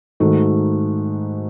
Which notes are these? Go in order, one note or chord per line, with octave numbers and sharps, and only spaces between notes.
G#2 D#3 A3 D#4 F#4